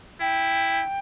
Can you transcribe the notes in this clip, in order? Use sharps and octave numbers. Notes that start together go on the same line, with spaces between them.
E4 G5